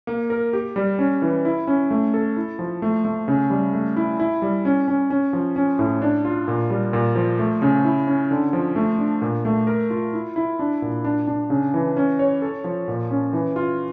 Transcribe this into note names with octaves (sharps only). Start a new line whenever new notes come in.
A#3
A#4
G4
G3
C#4
E3
E4
C#4
A3
A4
E4
F3
A3
A3
C#3
G3
A3
E4
E4
G3
C#4
C#4
C#4
F3
C#4
A2
D4
F4
A#2
G3
A#2
F3
A3
C#3
E4
C#4
D3
F3
A3
D4
A#2
A3
A#4
F4
E4
E4
D4
A#2
D4
D4
C#3
E3
C#4
C#5
A4
F3
A#2
C#4
E3
F4